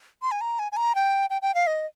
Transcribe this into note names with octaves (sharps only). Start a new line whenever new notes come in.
C6
G#5
A#5
G#5
G#5
A#5
G5
G5
G5
F5
D#5